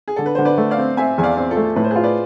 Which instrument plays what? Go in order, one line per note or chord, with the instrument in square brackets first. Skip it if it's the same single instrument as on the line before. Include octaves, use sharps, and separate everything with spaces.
[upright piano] G#4
[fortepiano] D3 [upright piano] A4
[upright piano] B4
[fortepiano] D3 [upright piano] C5
[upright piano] B4 D5
[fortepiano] A3
[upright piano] D5 F5
[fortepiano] C4
[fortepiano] C4 [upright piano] E5 G#5
[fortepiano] E2 [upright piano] G#5
[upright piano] D5 F5
[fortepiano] C4
[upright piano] F4 A4
[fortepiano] A3
[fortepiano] A2 [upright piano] B4
[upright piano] C5
G#4 B4
[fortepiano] F4
[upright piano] B4 D5